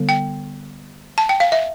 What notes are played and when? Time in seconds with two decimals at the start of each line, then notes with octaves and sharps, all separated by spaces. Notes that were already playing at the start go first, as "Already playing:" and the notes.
Already playing: D3 G3 B3
0.09 G5
1.18 A5
1.29 G5
1.40 F5
1.52 E5